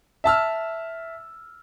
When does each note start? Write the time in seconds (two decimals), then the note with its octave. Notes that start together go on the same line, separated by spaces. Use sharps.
0.24 E5 A5 E6 F6